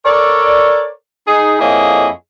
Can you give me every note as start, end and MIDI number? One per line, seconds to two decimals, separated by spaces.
0.04 0.87 69
0.04 0.87 70
0.04 0.87 73
0.04 0.87 74
1.27 1.56 63
1.27 1.56 68
1.59 2.07 41
1.59 2.07 58
1.59 2.07 64
1.59 2.07 68
1.59 2.07 73
1.59 2.07 75